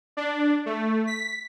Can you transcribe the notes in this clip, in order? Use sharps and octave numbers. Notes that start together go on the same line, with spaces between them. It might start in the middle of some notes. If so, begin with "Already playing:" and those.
D4
A3
B6